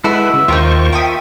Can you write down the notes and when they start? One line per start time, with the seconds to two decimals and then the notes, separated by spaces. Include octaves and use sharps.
0.04 G#3 E4 F#4 A4 B4 E5
0.33 C#3
0.48 D#2 D#4 F4 G4 A#4 C5 C#6
0.93 E5 G5 C#6 D#6